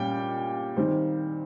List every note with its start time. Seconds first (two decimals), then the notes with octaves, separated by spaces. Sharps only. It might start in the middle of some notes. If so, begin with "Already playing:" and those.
Already playing: A#2 G3 C#4 G5
0.76 D#3 G3 C4 D#4